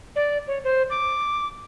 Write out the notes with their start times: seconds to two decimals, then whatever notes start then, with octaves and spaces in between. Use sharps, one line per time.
0.16 D5
0.47 C#5
0.64 C5
0.90 D6